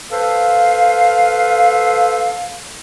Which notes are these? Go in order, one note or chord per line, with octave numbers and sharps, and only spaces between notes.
A4 B4 C5 F5